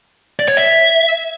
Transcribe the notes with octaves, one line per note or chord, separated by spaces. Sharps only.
D5
C#5
E5